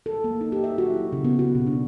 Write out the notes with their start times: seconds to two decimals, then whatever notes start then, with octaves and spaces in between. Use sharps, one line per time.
0.06 A4
0.24 A#3
0.41 D#4
0.52 G4
0.64 E5
0.78 F#4
0.94 E4
1.13 C#3
1.24 B3
1.39 F#4
1.55 B2
1.67 D4